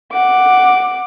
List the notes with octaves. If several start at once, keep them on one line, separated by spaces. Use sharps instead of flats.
F#5 D6